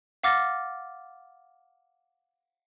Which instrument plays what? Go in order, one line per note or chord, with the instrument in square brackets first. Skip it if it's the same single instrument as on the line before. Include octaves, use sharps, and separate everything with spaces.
[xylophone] F5 F#5 D6 F6 A6 A#6